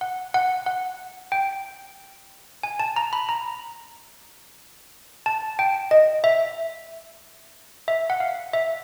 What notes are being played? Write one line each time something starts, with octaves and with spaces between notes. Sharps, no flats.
F#5
F#5
F#5
G5
G#5
A5
A#5
B5
A#5
A5
G5
D#5
E5
E5
F#5
F5
E5